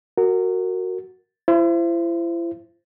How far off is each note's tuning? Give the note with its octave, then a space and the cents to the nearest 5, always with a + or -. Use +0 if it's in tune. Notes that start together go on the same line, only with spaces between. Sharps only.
F#4 +0 A#4 -20
E4 +40 C5 +0